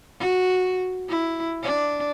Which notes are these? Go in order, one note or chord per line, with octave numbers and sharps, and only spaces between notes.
F#4
E4
D4